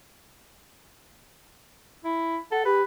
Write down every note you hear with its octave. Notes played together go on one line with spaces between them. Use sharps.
E4
A4 F#5
G4 B4